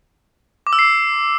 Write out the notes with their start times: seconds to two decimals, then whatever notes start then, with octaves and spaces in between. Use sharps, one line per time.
0.67 D6
0.73 E6
0.79 C7